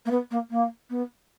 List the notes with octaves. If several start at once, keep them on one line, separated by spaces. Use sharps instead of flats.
A#3
B3
A#3
A#3
B3